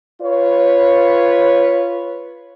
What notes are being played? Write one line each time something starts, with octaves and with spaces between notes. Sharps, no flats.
F4 B4 C#5